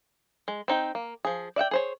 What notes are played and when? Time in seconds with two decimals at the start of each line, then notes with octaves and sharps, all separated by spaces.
0.48 G#3
0.68 C4 D#4 G5
0.95 A#3
1.25 F3 G#4
1.56 D5 E5 F#5 G5
1.71 G#4 C5 C#5